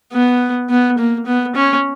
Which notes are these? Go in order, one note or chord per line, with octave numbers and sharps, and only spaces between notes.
B3
B3
A#3
B3
C#4